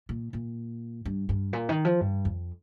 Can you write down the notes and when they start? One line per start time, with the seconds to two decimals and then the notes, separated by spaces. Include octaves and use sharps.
0.09 A#2
0.33 A#2
1.05 G2
1.29 G2
1.53 A#2
1.69 D#3
1.85 F3
2.01 G2
2.25 F2